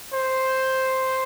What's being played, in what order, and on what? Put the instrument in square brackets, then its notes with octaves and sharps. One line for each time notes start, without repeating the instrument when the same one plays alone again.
[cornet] C5